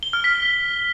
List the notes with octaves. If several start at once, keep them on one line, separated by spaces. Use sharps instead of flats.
G7
F6
B6